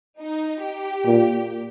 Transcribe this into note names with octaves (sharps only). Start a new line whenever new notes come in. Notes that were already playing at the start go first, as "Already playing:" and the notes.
D#4
G4
A#2